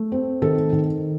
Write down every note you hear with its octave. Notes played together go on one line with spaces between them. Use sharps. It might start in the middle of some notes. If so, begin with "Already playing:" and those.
Already playing: A3
C4
D#3 A4
D#3